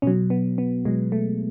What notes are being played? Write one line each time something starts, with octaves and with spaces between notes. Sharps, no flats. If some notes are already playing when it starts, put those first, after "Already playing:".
B2 F#3 C#4
B3
B3
B2 F#3 G#3
A3